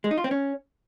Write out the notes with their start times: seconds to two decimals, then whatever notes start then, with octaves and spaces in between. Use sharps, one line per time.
0.04 G#3
0.11 D#4
0.18 F4
0.24 C4
0.31 C#4